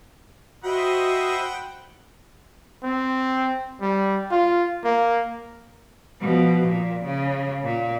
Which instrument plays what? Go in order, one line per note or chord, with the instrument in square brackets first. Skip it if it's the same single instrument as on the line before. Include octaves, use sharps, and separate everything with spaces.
[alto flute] F#4 [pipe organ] C5 D#5 E5 [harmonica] F#5 G5 B5
[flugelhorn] C4
G3
F4
A#3
[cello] B2 F3
A#2
C#3
A#2